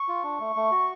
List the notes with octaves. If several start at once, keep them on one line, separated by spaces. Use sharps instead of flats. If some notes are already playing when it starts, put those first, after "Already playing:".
Already playing: C#6
F4
D4
A3
A3
F#4